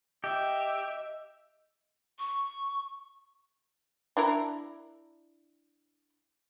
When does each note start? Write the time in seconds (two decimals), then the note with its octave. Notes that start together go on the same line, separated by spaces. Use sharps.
0.24 G4 D#5 E5
2.19 C#6
4.17 D4 E4 A#4